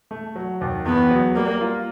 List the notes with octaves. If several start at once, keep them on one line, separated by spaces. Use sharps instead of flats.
A3
F#3
D#2
E2 B3
F#3
G3 A#3
F4